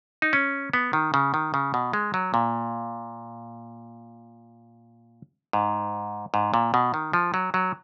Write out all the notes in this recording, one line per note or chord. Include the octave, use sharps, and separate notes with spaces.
D#4
C#4
B3
D#3
C#3
D#3
C#3
B2
G#3
F#3
A#2
G#2
G#2
A#2
B2
D#3
F3
F#3
F#3